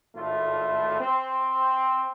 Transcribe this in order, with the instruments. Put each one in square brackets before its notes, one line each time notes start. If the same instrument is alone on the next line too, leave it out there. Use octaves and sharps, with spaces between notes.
[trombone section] G#1 A2 A3 F4
C4